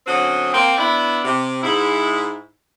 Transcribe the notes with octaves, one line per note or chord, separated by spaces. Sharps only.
D3 F#3 C4 C#4 F#4 D#5
A#3 C4
B3 D4 E4
C3
G#2 E4